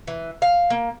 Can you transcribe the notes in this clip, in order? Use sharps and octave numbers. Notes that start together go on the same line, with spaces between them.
E3
F5
A#3